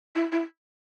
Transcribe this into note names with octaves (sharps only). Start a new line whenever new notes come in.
E4
E4